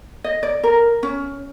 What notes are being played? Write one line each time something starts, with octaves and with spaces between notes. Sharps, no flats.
D#5
D5
A#4
C#4